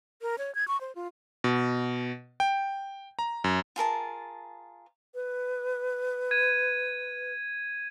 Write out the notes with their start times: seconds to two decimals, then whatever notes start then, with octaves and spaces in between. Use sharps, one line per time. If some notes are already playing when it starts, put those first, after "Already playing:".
0.22 A#4
0.38 C#5
0.55 G#6
0.68 C#6
0.81 C5
0.95 F4
1.44 B2
2.40 G5
3.19 A#5
3.44 F#2
3.76 F4 G#4 A#4 A5
5.15 B4
6.31 G#6 D#7